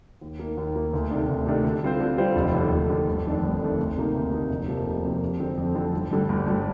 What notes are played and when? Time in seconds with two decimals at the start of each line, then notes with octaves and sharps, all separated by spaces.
0.21 D#2
0.39 D#3 A#3
0.58 D#2
0.75 D#3 A#3
0.94 D2
1.11 C3 D#3 A3 D4
1.29 D2
1.46 C3 D#3 A3 D4
1.64 D3
1.83 G3 C4 F4 C5
2.00 D3
2.18 G3 C4 F4 C5
2.36 F1
2.54 D#2 D3
2.72 F1
2.90 D#2 D3
3.07 G1
3.26 F2 D#3 A3 D4
3.43 G1
3.61 F2 D#3 A3 D4
3.79 D2
3.96 C3 D#3 A#3 D#4
4.15 D2
4.32 C3 D#3 A#3 D#4
4.50 F1
4.68 F2 C3 F3 A#3
4.86 F1
5.04 F2 C3 F3 A#3
5.22 F2
5.40 D3 F3 C4
5.58 F2
5.75 D3 F3 C4
5.93 G1
6.11 G2 D3 G3
6.29 G1
6.47 G2 D3 G3